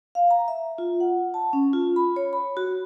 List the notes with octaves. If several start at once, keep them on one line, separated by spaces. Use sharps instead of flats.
F5
A#5
E5
F4
F#5
A5
C#4
F4
B5
C#5
B5
F#4